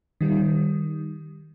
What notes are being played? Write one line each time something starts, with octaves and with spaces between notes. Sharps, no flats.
D#3 G3